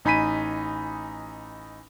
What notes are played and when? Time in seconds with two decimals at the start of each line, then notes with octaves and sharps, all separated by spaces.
0.05 A1 D#4 G#5 B5 B6 D#7